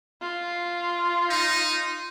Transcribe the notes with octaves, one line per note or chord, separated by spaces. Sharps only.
F4
D#4